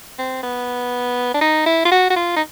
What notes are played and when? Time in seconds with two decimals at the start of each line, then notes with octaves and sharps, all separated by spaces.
0.18 C4
0.43 B3
1.34 D4
1.41 D#4
1.66 E4
1.85 F4
1.91 F#4
2.10 F#4
2.16 F4
2.36 D#4